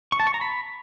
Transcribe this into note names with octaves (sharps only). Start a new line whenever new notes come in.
C#6
A5
C#6
A#5
B5